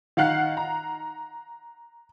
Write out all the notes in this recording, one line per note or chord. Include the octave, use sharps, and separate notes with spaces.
D#3 F5 F#5 F#6 C7
A#5